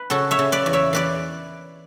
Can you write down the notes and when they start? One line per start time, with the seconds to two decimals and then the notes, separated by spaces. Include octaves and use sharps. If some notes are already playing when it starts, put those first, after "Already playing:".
Already playing: B4
0.10 C#3 F#4 A4
0.31 C#5 E5
0.39 C#3
0.52 B4 D5
0.66 E2
0.73 C#5 E5
0.93 E3 B4 D5